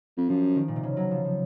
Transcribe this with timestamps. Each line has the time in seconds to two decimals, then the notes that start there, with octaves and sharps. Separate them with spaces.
0.17 F2
0.29 F#2 F3
0.56 D#3
0.68 A#2
0.76 C3
0.83 C#3
0.97 F#3
1.11 F3
1.24 F3